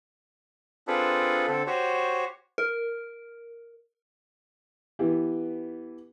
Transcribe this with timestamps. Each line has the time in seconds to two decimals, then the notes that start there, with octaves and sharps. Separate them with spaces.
0.87 C4 D4 F4 G#4 A4 B4
1.47 D3 C4 A4
1.67 F#4 G4 C5 C#5
2.58 A#4
4.99 E3 B3 G4